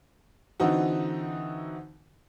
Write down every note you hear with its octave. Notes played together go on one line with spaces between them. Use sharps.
D3 E3 C4 D#4 F#4